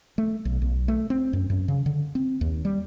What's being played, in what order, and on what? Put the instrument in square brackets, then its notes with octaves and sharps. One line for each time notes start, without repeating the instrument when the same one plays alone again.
[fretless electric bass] A3
B1
B1
A3
C4
F#2
F#2
C#3
D3
C4
D#2
G3